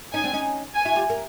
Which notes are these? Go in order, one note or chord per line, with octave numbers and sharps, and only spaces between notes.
C#4 D#4 G#5
C4 D4
C#4 D#4
G#5
E4 F#4
F4 G4
A#4